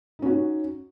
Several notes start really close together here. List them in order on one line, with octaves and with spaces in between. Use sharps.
D#4 C#4 F#4